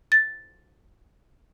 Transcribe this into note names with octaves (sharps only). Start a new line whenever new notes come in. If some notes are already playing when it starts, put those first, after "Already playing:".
A6